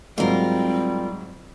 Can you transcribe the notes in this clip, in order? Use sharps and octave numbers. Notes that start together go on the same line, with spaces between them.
G#2 F#3 G3 C4 F4 A#4